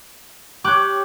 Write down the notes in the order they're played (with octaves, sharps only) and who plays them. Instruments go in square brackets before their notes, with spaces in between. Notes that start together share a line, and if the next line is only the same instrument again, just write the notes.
[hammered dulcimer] G4 C#5 [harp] D6 F#6 G6